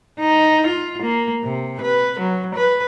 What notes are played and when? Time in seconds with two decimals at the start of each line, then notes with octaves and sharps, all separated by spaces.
0.19 D#4
0.67 F4
1.02 A#3
1.43 C3
1.81 B4
2.20 F#3
2.55 B4